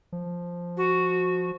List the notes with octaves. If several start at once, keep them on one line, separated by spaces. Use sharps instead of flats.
F3
F#4